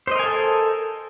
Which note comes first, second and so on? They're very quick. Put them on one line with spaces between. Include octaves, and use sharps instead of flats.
C5 D#5 A#4 G#5 A4